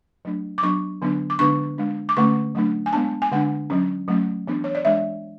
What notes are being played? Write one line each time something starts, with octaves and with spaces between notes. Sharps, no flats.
F#3 A3 D4
D6
F#3 B3 D4 C#6
D3 F#3 B3 D4
D6
D3 G#3 B3 D4 C#6
G#3 D4
D6
D3 A3 C#4 C#6
F#3 A3 D4
G#5
G#3 B3 D4 A5
G#5
D3 G#3 D4 F#5
F#3 C#4
F#3 A3 C#4
E3 B3 D4
C#5
D5
E3 G#3 D4 E5